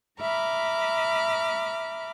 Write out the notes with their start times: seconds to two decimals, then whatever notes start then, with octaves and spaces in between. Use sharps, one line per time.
0.20 E5 A#5 B5 D6 F6